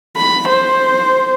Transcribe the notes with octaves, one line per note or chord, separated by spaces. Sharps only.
B5
C5